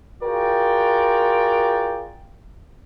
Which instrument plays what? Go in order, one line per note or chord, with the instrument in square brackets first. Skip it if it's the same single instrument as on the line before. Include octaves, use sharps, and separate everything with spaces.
[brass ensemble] F4 F#4 G#4 A#4 D5 G5